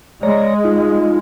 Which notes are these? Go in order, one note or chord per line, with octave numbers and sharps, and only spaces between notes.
G#3 C#5 D5 A#5
D#4 F4